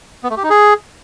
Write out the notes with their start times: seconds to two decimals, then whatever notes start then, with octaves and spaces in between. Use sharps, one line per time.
0.24 B3
0.30 A3
0.37 G4
0.43 D#4
0.50 G#4